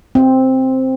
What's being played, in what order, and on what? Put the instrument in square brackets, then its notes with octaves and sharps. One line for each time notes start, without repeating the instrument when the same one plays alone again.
[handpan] C4